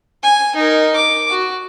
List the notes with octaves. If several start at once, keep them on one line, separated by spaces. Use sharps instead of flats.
G#5
D#4 A#4
D6
F#4